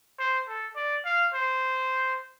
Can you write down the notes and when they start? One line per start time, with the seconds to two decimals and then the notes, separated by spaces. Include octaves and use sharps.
0.19 C5
0.48 A4
0.76 D5
1.05 F5
1.34 C5